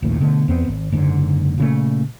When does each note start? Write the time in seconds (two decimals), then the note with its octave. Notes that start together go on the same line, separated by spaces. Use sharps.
0.02 D#1 A#1 D#2 A2
0.20 B2 D3 A3
0.48 E2 B3 C4
0.68 G#1
0.92 F#1 G#2 D3
1.58 A#2 C#3 A3